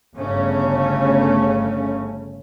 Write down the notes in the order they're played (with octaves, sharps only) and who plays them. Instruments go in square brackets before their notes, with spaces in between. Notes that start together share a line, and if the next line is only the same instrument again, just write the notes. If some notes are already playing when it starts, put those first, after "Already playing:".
[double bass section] G1 C#3 A3 C#4